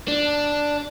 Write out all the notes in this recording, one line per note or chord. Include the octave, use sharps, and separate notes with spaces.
D4